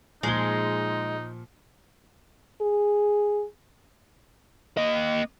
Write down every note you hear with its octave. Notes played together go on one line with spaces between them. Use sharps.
A#2 F3 G#3 D#4 G7
G#4
A#3 D#5